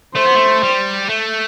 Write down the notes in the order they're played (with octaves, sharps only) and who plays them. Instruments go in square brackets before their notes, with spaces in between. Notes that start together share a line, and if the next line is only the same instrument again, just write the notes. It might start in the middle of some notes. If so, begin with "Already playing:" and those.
[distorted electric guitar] A3 [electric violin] C5
[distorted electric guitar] B3
A3
G3
A3